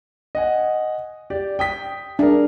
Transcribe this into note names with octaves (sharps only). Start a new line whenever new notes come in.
D#5 F#5 G#5
G4 D5
G5 D#6 B6
D4 G#4 A#4